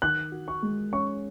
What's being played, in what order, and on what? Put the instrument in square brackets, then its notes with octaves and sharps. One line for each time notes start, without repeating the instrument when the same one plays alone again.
[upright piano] D#3 [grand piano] F#6
[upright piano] F#4
[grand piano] C#6
[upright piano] G#3
[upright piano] C#4 [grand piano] C#6